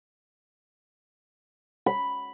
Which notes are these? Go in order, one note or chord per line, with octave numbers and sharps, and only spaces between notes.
B5